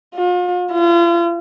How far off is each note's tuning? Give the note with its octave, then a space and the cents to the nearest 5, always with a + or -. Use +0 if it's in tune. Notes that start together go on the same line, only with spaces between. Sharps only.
F4 +40
F4 -40